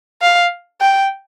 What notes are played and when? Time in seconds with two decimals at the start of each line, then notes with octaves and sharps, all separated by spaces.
0.22 F5
0.81 G5